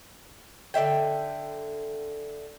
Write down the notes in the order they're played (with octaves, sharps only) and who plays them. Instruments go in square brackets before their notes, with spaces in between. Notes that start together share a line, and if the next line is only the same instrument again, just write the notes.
[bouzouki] D3 B4 E5 G5